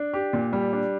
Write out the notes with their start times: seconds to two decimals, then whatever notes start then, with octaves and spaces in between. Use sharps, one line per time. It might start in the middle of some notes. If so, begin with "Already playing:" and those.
Already playing: D4
0.14 G4
0.33 A#2
0.53 G3
0.73 D4